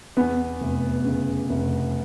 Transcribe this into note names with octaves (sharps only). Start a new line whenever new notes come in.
E2 B3
F1
C#3
F1